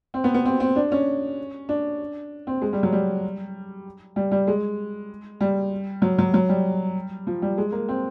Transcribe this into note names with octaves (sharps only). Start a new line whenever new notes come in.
C4
B3
B3
C4
C4
D4
C#4
D4
C4
G#3
G3
F#3
G3
G3
G3
G#3
G3
F#3
F#3
F#3
G3
F3
G3
G#3
A#3
C4